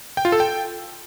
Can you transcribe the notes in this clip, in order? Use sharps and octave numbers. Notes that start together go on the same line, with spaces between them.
G5
F4
A4
G5